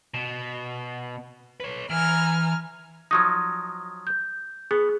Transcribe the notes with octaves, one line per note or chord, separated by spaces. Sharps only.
B2
B4 C#5
E3 G#5 A#5 F6
F3 F#3 D#4 D#6 G#6
G6
B3 G#4